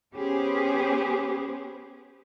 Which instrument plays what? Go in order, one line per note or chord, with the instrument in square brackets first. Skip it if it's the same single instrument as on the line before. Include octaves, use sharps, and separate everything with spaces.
[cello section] B3 C#4 G4 G#4 C5